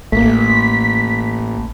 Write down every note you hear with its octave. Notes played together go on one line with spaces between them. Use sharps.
A1 A3 A#3 B6